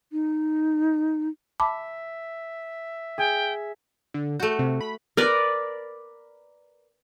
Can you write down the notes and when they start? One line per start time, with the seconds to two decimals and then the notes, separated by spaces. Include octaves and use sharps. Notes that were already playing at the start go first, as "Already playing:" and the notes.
0.12 D#4
1.60 E5 A5 B5 D6
3.18 G#4 G5
4.14 D3
4.40 A3 F#4 G6
4.59 C3
4.81 B5
5.17 A#4 B4 D5